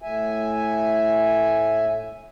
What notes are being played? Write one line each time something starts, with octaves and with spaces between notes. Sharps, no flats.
A2 E5 G#5